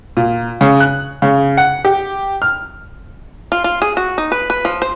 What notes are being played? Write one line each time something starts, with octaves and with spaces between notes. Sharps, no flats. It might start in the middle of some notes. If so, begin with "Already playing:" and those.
A#2
C#3
F#6
C#3
F#5
G4
F6
F4
F4
G#4
F#4
D#4
B4
B4
F3
C5